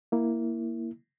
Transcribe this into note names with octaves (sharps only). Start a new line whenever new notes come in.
A#3 E4